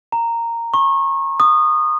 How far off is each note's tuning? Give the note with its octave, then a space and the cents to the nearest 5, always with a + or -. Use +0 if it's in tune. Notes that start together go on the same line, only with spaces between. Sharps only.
A#5 -10
C#6 -30
D#6 -20